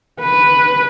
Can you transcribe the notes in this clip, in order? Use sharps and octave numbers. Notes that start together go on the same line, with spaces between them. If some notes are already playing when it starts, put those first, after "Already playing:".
B4